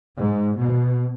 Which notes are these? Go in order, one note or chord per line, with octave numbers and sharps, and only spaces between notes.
G#2
B2